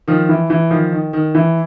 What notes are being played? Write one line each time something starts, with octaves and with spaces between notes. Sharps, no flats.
D#3 F3
E3
E3
D#3 F3
D#3
D#3
E3